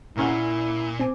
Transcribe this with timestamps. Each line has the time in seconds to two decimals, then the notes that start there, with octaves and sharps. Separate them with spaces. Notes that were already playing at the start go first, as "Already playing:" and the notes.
0.17 A#2 A#3 C#4 E4 F#5
1.00 C4 G#5 D6